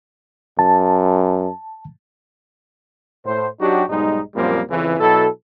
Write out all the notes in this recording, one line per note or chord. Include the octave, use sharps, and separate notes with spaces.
F#2 A5
A2 C5
F#3 D4 D#4 F#4 G4
B1 G#2 G3 G#3 D#4
F#2 A#2 F3 G3 A#3 C4
F2 C#3 E3
B2 F#3 E4 A4